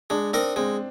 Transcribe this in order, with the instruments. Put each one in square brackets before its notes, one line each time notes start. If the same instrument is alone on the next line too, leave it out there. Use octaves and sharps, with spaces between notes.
[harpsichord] G#3 [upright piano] D4
[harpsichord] C4 D#4 A#4 [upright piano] D4
[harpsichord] G#3 [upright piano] C4